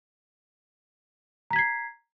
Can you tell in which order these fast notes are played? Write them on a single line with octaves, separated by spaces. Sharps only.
A#5 B6 G#6 C7